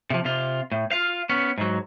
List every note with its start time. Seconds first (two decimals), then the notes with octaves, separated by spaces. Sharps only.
0.10 C3 F3
0.25 C3 F4
0.72 A2
0.91 F4 F5
1.30 B3 C#4
1.58 G#2 F#3